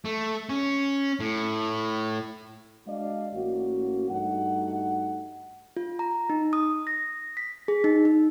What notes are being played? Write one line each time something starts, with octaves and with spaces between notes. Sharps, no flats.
A3
C#4
A2
G#3 D4 F#4 D5 D#5 F5
A1 A#3 C#4 F#4
G2 A3 D#4 F#4 F#5
F4
A#5
D#4
D#6
A#6
B6
G#4
D#4
D#4